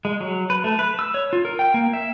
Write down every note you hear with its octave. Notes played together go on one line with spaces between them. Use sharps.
G#3
F#3
B4
A3
B4
E6
C#5
F4
A#4
G5
A#3
E5